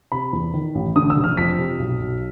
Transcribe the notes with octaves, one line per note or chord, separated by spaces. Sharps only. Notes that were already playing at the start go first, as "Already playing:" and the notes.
C3 B5
E2
D#3
A1
D3 D#6
E6
F1
F6
F2 B6
C3
B1
B1